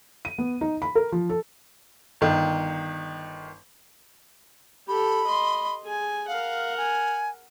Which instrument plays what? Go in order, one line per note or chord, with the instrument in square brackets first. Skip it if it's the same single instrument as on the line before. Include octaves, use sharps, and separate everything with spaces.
[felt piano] D#7
B3
D#4
B5
A#4
F3
A4
[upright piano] G1 D#3
[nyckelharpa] G4 A4 [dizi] B5
[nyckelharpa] D#5 C6
G#4 G#5
[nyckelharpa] A#4 F#5 [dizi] F5
[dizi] G#5